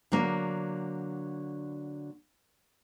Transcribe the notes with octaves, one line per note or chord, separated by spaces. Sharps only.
D3 F#3 A#3